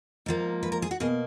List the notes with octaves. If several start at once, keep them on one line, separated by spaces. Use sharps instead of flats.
G#2 F3 A#3
B4
A#4
G#4
F#4
B2 A#3 G#4